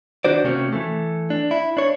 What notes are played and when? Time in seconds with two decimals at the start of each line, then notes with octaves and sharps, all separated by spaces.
0.25 D#3 D4 F#4 C5 D5
0.44 C3 A3 A#3 C4 C#4 F#4
0.73 E3 A3
1.30 D4
1.51 E4
1.77 D4 C#5